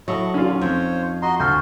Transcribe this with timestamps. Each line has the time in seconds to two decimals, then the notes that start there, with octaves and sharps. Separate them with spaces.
0.08 F#3 E4 A4 D#5 C#6
0.34 E2 A#2 D3 C#4 D#4 F4
0.61 F2 C5 C#5
1.22 F#4 D#5 A#5 C6
1.40 D2 F#4 A4 C6 C#6 F6 G6